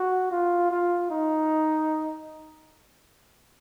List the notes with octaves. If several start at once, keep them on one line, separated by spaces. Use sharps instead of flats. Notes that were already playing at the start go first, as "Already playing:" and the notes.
Already playing: F#4
F4
F4
D#4